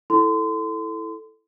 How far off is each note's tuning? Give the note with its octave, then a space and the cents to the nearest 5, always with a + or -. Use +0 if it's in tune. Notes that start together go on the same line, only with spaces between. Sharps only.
E4 +0 A4 +0 C6 -30